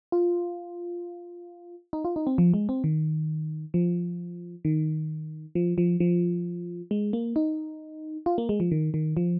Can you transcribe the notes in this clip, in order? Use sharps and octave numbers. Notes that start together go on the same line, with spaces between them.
F4
D#4
F4
D#4
C4
F3
G#3
C4
D#3
F3
D#3
F3
F3
F3
G#3
A#3
D#4
F4
A#3
G#3
F3
D#3
D#3
F3